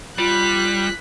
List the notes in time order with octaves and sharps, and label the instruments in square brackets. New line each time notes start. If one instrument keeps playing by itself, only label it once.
[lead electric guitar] G3 [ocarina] F4 [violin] F#6 B6